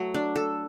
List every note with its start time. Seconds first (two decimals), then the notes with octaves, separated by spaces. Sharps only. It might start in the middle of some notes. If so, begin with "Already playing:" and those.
Already playing: F#3 A3
0.14 D4
0.36 A4